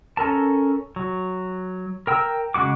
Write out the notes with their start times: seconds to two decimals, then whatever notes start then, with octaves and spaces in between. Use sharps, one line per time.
0.17 C#4 A4 A#4 A5
0.96 F#3
2.07 A#4 G5 E6
2.54 C#3 G#3 F#4 D6